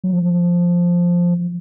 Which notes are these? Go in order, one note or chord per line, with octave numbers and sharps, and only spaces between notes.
F#3
F3